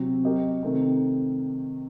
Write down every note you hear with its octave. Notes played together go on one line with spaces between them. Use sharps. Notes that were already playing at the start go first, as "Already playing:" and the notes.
Already playing: C3 F#3 C4
F#3 C4 G4 A#4 D#5
C3 D#3 A3 C4